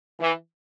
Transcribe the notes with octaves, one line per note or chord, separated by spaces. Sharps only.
E3